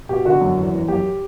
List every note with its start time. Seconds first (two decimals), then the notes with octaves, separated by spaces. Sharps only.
0.09 B2 G4
0.25 D3 F#4
0.41 F#2
0.57 E2
0.73 E3
0.88 F#2 G4